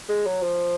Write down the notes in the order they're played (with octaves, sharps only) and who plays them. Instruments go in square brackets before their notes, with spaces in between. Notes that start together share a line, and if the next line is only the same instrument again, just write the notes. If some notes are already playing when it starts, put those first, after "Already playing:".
[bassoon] G#3
F#3
F3